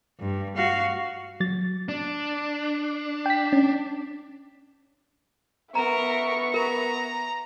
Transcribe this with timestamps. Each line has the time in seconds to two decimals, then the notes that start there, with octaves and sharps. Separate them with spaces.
0.20 G2
0.56 F#4 F5
1.40 F#3 A6
1.89 D4
3.26 G5 B6
3.53 C#4
5.75 B3 A#4 E5 A#5 C#6
6.54 A#4 A#5